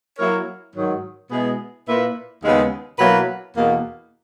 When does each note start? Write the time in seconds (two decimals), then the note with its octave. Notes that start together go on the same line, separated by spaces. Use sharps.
0.18 F#3 A#3 E4 A#4 C#5
0.74 G#2 D#3 F#3
1.30 B2 G#3 B3 E4 G#4
1.87 A#2 A#3 E4 B4
2.42 D#2 C#3 G#3 B3
2.99 B2 F#3 A#3 E4 B4
3.55 E2 B2 A#3